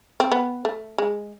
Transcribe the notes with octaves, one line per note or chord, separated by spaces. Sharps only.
C4
B3
A3
G#3